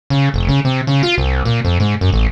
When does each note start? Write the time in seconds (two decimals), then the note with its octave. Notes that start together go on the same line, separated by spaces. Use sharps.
0.10 C#3
0.34 F1
0.48 C#3
0.65 C3
0.87 C#3
1.03 F4
1.18 C2
1.45 A#2
1.65 F2
1.80 G#2
2.01 F#2
2.13 A1